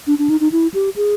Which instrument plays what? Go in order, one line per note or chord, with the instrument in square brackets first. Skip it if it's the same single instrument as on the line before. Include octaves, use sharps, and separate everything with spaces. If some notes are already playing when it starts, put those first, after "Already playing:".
[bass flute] D4
D4
D#4
D#4
E4
G4
G#4